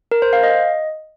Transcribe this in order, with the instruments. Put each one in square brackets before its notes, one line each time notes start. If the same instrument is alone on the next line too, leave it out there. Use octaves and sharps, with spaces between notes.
[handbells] A#4
C5
F5
D#5